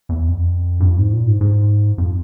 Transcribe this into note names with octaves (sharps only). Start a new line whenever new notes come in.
E2
F2
G2
F2
G#2
A#2
G#2
G#2
F2